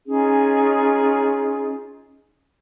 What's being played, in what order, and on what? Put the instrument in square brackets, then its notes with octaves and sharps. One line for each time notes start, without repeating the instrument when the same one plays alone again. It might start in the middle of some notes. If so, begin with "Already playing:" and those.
[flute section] C#4 D#4 F4 G#4